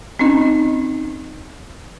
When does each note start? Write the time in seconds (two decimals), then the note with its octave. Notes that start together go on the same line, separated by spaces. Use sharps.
0.19 C4 C#4 D#4 D#5